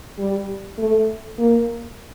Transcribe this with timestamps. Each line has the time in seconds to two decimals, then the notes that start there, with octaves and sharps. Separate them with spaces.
0.19 G3
0.78 A3
1.39 A#3